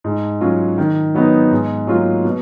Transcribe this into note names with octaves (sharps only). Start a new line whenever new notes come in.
G#2
F#3 C#4 F4
D#3
F#3 B3 D#4
G#2
F#3 A#3 F4
B2